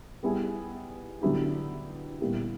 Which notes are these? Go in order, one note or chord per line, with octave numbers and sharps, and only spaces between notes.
G3 B3 E4 G#4
D3 F#3 B3 E4 G4
A#2 G3 B3 E4 G4